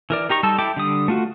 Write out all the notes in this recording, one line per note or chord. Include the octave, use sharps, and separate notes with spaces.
E3 A#4 D5
D#4 G4 A#5 C#6
G3 D#4 A4 A5 E6
E4 A4 G5 D6
D3 G3 D#6
A3 F4 F#4